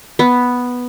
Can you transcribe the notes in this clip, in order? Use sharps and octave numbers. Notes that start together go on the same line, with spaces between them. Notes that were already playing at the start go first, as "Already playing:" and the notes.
B3